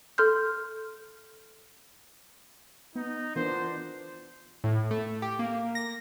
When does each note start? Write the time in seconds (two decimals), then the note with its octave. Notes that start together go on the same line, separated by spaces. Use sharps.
0.18 A4 C6 F6 G6
2.95 B3 D#4
3.36 E3 B3 D4 F4 A#4 C5
4.64 A2
4.91 A3
5.22 G4
5.39 A#3
5.75 A#6